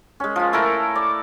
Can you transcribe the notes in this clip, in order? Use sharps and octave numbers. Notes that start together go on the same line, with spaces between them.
G#3 C#4
F3 F4
A3 E4 A4 A#4
D5